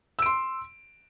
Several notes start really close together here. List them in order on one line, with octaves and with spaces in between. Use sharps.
E6 D7 C6